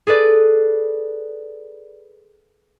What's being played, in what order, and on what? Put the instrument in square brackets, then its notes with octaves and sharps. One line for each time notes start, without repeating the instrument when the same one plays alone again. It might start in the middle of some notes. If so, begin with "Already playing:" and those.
[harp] G#4 A4 B4 D5